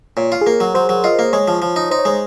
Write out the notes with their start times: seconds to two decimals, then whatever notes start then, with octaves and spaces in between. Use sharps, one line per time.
0.17 A#2 C#5
0.32 F4
0.41 G#4
0.47 A#3 A#4
0.60 F#3
0.74 F#3 C5
0.89 F#3
1.04 F4 D#5
1.19 A#3
1.33 G#3 C#5
1.48 F3
1.62 F3
1.76 D#4
1.91 D#4 C5
1.99 C#5
2.05 G#3 C5